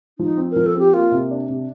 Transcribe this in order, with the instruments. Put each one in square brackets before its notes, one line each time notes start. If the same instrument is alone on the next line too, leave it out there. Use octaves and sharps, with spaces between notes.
[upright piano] F3 [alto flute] D#4
[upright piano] C4
[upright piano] F3 [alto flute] A#4
[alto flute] A4
[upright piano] C4 [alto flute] G4
[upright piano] A#3 [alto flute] F4
[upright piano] C3
D4
C3